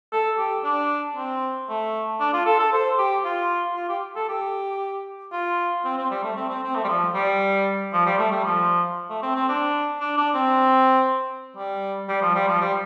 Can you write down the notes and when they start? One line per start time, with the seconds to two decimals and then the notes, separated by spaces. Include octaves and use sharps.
0.12 A4
0.38 G4
0.64 D4
1.16 C4
1.69 A3
2.20 D4
2.33 F4
2.46 A4
2.59 A4
2.73 C5
2.98 G4
3.25 F4
3.76 F4
3.89 G4
4.16 A4
4.28 G4
5.32 F4
5.85 C4
5.98 C4
6.11 G3
6.24 A3
6.36 C4
6.50 C4
6.63 C4
6.75 A3
6.84 G3
6.89 F3
7.14 G3
7.93 F3
8.06 G3
8.19 A3
8.31 G3
8.44 F3
9.10 A3
9.23 C4
9.35 C4
9.49 D4
10.01 D4
10.17 D4
10.35 C4
11.56 G3
12.09 G3
12.22 F3
12.35 G3
12.48 F3
12.61 G3